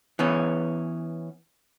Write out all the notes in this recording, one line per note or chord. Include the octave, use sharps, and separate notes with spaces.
E3 B3 C#4